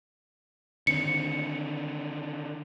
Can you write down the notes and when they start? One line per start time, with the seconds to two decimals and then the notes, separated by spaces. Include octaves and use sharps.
0.87 D3 D#3 C4 C#7